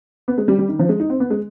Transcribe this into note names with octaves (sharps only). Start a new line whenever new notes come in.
B3
G#3
G3
G3
D#3
F3
G#3
D#4
C4
B3
G#3